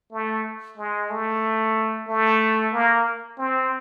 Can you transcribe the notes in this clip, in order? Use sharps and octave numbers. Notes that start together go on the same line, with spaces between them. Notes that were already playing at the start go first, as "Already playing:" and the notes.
A3
G#3
A3
A3
A#3
C4